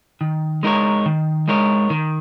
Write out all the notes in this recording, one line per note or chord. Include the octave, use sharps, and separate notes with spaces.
D#3
G#3 D#4 A#4 C#5
D#3
G#3 D#4 A#4 C#5
D#3